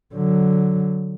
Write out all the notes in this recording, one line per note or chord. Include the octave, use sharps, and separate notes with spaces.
D3 F#3